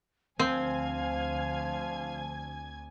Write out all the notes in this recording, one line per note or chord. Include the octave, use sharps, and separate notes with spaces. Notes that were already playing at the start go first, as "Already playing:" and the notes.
D2 F3 C4 F5 G#5 G#6